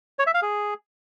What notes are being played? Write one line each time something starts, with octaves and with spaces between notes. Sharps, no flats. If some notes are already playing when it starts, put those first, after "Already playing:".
C#5
E5
F5
G#4